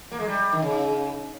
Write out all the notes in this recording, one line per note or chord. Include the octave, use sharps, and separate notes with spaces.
A#3
G#3
G3
D#3
C#3